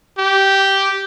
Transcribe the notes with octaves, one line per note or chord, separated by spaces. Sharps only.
G4